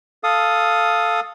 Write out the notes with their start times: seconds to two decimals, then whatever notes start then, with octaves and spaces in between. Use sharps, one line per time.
0.24 A4 F5 D#6